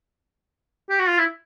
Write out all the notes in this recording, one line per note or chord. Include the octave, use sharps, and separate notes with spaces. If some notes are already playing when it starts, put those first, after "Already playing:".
G4
F#4
F4
E4